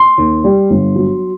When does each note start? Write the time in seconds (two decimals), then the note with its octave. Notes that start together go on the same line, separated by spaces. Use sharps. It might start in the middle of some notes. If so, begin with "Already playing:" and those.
Already playing: C6
0.18 D#2
0.44 G3
0.70 G1
0.95 F#3